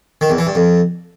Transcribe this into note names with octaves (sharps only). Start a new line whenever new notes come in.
D#3
E2
E3
G2
F2